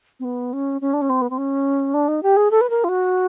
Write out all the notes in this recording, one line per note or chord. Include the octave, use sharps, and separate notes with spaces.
C4
B3
C#4
C#4
D4
C#4
C4
B3
C4
C#4
D4
D#4
G4
G#4
A4
B4
A#4
F4
F#4